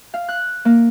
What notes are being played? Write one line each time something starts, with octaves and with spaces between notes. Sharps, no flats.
F5
F#6
A#3